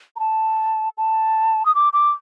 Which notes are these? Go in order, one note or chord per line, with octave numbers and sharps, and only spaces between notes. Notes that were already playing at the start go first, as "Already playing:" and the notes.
A#5
A5
A5
D#6
D6
D6